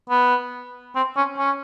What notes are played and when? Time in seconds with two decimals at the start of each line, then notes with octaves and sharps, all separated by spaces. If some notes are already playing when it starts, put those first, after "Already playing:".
0.10 B3
0.96 C4
1.17 C#4
1.38 C#4